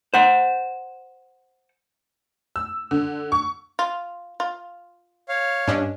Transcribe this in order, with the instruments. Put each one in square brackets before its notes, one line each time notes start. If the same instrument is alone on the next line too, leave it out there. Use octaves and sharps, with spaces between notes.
[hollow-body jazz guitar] C5 F#5
[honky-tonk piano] E6
D3
C#6
[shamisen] F4
F4
[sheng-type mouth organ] C#5 F5
[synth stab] G2 C#4 D4 [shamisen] D#5